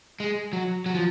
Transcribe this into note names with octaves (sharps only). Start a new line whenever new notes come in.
G#3
F#3
F#3
F3